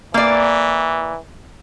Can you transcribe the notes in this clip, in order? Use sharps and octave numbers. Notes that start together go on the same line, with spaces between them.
E3 A#3 D5